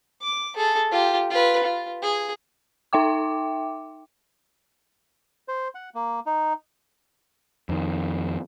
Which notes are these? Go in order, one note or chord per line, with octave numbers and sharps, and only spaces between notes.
D6
G#4 A4
F4 G4
F4 B4
F4
G#4
D#4 E5 G5 D6
C5
F#5
A#3
D#4
F2 D#3